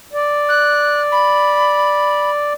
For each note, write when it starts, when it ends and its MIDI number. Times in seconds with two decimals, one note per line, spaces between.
0.13 2.53 74
0.49 1.02 90
1.12 2.31 83